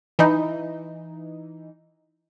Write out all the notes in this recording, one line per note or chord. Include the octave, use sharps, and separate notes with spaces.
E3 D#4